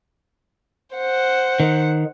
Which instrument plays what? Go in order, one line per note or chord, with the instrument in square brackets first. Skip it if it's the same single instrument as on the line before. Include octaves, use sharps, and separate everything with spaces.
[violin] C5 F#5
[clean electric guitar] D#3